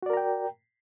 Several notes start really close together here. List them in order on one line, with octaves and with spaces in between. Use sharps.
F#4 D5 A#4 A#5 G5